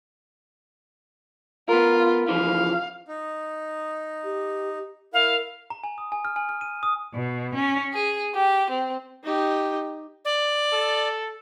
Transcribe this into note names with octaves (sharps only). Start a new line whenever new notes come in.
B3 F4 A#4
C#3 E3 F3 F5
D#4
G4
E4 A#4 F5
A#5
G#5
D#6
G#5
F6
G#5
F6
D#7
D#6
B2
C#4
G#4
G4
C4
D#4 G4
D5
A4